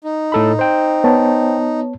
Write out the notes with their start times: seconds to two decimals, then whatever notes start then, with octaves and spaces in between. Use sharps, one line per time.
0.04 D#4
0.32 A2 A4 B5
0.59 C5 G5
1.04 B3 C#5 A5